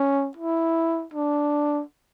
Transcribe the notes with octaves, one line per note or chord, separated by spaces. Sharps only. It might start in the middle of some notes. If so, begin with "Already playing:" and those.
Already playing: C#4
E4
D4